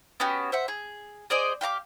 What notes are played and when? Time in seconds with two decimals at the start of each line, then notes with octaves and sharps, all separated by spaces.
0.20 B3 C#4 F#4 G4
0.52 C5 E5 F#5
0.68 G#4
1.30 G#4 C5 D5 D#5
1.61 G4 F5 A#5 D6